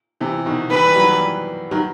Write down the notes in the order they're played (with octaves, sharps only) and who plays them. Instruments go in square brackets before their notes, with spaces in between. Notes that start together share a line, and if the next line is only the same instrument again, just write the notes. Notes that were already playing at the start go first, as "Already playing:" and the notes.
[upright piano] C3 E3
B2 D#3
[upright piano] C3 E3 [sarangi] B4
[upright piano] E3 G3
D#3 F#3
E3 G3
D#3 F#3